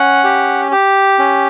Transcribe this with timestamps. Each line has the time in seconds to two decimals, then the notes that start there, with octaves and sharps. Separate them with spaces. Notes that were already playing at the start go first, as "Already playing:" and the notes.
Already playing: C#4 F#5
0.24 G4
0.71 G4
1.19 C#4